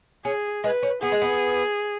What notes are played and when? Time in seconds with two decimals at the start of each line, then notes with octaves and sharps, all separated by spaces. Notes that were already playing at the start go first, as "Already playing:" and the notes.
0.25 C#4 G#4
0.64 G#3 B4
0.83 C#4
1.02 B3 G#4
1.12 G#3
1.22 B3